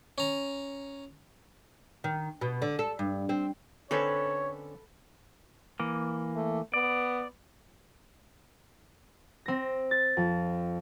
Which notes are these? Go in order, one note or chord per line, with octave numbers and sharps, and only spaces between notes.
C#4 A#5
D#3
B2
D3
A4
G2
C4
D3 C4 C#4 A4 B4 C#5
E3 A#3
A3
B3 D5
C4 A#6
A6
F2